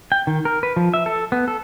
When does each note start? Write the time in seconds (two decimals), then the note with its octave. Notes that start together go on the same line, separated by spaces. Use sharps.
0.12 G5
0.27 D#3
0.45 A#4
0.63 B4
0.76 F3
0.94 E5
1.06 A4
1.32 B3
1.48 A4